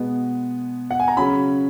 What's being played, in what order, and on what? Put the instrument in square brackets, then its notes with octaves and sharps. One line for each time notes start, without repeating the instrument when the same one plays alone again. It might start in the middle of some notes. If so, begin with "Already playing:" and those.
Already playing: [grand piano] B2 G#3 B3
F#5
G#5
A#5
C#3 F#3 C#4 B5